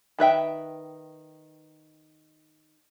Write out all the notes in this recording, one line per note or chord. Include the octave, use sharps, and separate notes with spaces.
D#3 B4 E5 G5